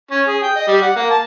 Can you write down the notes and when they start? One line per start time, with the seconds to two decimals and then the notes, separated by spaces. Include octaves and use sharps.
0.11 C#4
0.28 G#4
0.43 G5
0.56 D#5
0.68 G3
0.83 F#5
0.96 A#3
1.10 A5